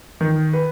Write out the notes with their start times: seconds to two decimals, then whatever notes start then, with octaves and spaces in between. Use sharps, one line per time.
0.21 D#3
0.53 B4